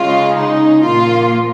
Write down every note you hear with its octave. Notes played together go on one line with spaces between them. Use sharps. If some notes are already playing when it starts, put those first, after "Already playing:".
Already playing: C#3 G#3 F4
D#4
A#2 F3 A#3 F4